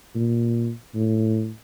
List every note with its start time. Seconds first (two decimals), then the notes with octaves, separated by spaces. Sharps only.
0.15 A#2
0.95 A2